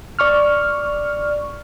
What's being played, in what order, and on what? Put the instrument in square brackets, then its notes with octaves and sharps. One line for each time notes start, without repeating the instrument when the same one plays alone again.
[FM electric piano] D5 C#6 F6